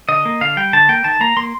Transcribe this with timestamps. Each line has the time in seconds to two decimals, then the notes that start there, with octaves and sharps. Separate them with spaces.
0.09 D3 D#5
0.25 A#3
0.41 D3 F5
0.57 G3 G5
0.73 D3 A5
0.89 A#3 G5
1.04 D#3 A5
1.21 A#3 A#5
1.37 A#3 C6